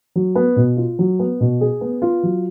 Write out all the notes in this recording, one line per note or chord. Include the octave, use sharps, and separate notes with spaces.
F#3
B3
B2
F4
F#3
B3
B2
G#4
B3
F4
F#3